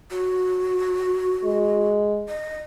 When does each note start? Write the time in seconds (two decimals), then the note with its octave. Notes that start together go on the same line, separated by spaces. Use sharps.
0.11 F#4
1.45 G#3
2.29 D#5